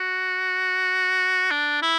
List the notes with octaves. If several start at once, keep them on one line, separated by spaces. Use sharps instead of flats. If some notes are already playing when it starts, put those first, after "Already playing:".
Already playing: F#4
D4
E4